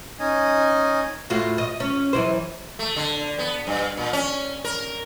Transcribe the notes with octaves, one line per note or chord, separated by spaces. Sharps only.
C#4 D#4 D#5 G#5
A2 F4 F#4
D#5
C#4
F#2 E3 C5
A3
D3
B3
G2
A#2
C#4
A#4